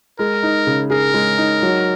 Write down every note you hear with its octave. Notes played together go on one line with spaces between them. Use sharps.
G#3 A#4
D#4
C#3
G#4 A#4
G#3
D#4
F#3